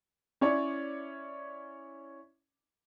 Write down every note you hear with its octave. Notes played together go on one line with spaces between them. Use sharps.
C#4 E4 C#5 D5